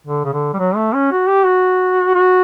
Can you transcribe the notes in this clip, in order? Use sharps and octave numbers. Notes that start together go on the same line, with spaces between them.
D3
C#3
D3
G3
F#3
A3
C#4
F#4
G4
F#4
F#4